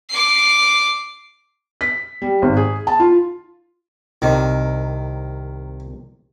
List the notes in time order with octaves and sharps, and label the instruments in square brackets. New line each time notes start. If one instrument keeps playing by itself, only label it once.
[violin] D6 C7
[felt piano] B6
G3
G#1
G#4
A5
F4
[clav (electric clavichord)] C2 C3 [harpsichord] D#3